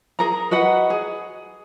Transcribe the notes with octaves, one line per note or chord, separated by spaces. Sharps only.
G#4 A#4 A#5
F#4 B4 D#5 F#5
G#4